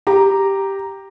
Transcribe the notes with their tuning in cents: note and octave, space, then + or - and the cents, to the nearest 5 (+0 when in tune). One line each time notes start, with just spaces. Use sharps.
G4 +0 A#5 +0